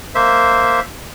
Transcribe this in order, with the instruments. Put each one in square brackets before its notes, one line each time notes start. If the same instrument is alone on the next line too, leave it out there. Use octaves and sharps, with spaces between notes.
[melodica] A#3 C5 E5